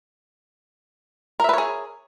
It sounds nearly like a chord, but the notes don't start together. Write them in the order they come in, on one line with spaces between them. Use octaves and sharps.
A#4 E5 B4 C#5 G#4